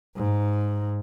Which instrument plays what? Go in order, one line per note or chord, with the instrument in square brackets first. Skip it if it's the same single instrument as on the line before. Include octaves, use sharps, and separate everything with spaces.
[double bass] G#2